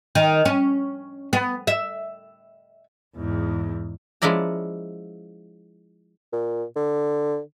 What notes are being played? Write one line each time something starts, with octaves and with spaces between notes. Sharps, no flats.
D#3
C#4
B3
E5
E2 G#2
F3 G#3 C#4 E4 D5 A#5
A#2
D3